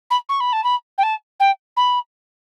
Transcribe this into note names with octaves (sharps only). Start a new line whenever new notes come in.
B5
C#6
B5
A5
B5
G5
A5
G5
B5